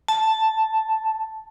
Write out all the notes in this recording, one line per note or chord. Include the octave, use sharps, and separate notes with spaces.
A5